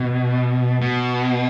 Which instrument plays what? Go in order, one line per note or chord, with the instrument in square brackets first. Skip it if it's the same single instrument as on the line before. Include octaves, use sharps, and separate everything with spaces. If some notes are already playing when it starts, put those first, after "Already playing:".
Already playing: [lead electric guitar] B2
B2